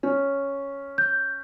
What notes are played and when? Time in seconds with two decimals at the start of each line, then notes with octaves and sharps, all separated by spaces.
0.03 C#4
0.98 G6